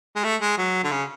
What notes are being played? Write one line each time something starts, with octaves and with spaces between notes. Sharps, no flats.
G#3
A3
G#3
F#3
D3
C#3